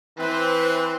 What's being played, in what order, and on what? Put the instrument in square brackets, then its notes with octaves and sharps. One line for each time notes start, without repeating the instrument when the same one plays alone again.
[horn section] E3 C4 [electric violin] B4 C5